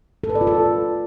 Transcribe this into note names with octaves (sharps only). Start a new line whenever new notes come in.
A4
B4
D5
F4
A4